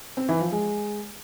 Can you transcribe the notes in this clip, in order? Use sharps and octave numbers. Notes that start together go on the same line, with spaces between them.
C4
E3
F3
G#3